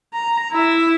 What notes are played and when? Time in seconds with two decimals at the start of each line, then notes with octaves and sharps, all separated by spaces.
0.14 A#5
0.52 E4 E5